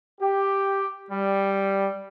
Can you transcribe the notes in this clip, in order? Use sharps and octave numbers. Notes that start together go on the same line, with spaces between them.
G4
G3